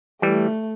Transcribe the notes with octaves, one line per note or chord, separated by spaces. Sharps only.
E3 G3 A3